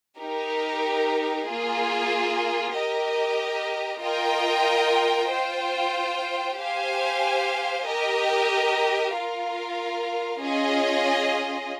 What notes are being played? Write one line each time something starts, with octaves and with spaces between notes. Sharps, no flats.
D#4 G4 A#4
A#3 F4 G#4
G4 A#4 D#5
F4 A#4 D#5 G5
F4 C5 G5
G4 C5 F5 G#5
G4 A#4 D#5
F4 A#4 F5
C#4 F4 G#4 D#5